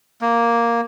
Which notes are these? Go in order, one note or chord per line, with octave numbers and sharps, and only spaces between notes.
A#3